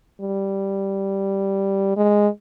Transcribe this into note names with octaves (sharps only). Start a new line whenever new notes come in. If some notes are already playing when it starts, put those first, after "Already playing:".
G3
G#3